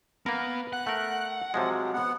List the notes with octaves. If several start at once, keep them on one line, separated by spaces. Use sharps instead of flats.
A#3 B3 A#4
F#5 F#6
A3 A#4 F#5
C3 F3 F#3 G#3
B3 F#5